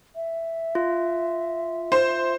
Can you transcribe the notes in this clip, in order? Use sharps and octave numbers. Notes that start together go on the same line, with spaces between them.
E5
F4
C5